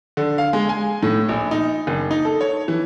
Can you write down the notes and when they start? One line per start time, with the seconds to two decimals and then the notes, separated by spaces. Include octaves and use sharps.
0.17 D3
0.38 F5
0.53 G#3
0.69 G#5
1.03 A2
1.29 A#1
1.51 D#4
1.87 F#1
2.11 D#4
2.25 A4
2.41 C#5
2.68 E3